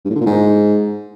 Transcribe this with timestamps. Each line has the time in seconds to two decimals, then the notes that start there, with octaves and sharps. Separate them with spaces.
0.05 G2
0.10 A2
0.16 D3
0.21 A#2
0.26 G#2